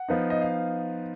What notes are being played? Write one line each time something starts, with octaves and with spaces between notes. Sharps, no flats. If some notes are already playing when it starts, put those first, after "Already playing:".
Already playing: F#5
F3 B3 D#4
D#5
F5